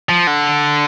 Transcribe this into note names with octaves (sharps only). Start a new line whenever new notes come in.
F3
D3